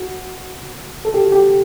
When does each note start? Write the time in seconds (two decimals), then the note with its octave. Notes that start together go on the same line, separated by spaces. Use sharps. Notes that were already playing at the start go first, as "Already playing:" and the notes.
Already playing: F#4
1.05 A4
1.14 G4
1.23 F#4
1.32 G4